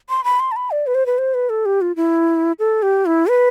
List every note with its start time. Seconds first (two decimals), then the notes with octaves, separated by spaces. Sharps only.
0.09 C6
0.24 B5
0.40 C6
0.52 A5
0.56 B5
0.71 D5
0.87 B4
0.95 C5
1.06 B4
1.18 C5
1.34 B4
1.50 A4
1.66 G4
1.81 F4
1.96 E4
2.59 A4
2.82 G4
3.06 E4
3.29 B4